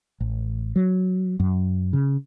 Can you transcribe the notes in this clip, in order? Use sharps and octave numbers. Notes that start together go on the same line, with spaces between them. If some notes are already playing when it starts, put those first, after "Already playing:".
A1
F#3
F#2
C#3